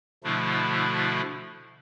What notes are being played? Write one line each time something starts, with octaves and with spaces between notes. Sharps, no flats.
B2 D3 F3 A3 D4 E4